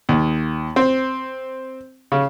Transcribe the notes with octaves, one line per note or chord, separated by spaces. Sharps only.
D#2
C4
C#3